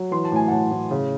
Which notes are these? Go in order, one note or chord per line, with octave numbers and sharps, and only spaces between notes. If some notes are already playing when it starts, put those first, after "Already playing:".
Already playing: F#3
E3 C6
A5
A2 G#5
A2 F#5 A5
A2
C#3